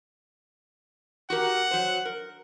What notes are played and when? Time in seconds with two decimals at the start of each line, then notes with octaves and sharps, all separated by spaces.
1.30 F#4 G4 A#4 F#5
1.71 F#3 C5
2.05 A#4